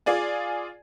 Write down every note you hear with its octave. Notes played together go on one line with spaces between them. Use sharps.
F4 G#4 D5 G#5